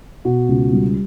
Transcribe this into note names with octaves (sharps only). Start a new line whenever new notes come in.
B2 F#4
C#2
G3